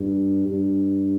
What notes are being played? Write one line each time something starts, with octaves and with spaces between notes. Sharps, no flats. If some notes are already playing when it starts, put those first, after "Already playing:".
Already playing: G2
G2